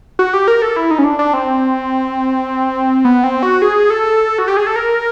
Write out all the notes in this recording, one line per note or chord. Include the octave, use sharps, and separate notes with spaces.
F#4
G4
A#4
A4
E4
D#4
C#4
D4
D4
C4
B3
C4
F#4
G#4
A4
F#4
G4
G#4
A4
A#4